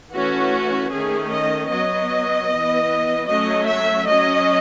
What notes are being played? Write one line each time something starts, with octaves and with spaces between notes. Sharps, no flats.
E3 A3 C#4 F#4
D#3 A3 C#4 G#4
D#5
F#3 B3 D#5
E3 B3
F#3 A3 C#4 D#5
E5
F#3 C#4 D#5